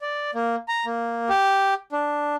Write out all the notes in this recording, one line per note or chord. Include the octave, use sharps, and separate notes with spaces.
D5
A#3
A#5
A#3
G4
D4